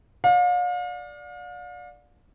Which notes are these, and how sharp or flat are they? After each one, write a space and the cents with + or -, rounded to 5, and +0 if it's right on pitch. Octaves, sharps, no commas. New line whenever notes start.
D5 +0 F5 +40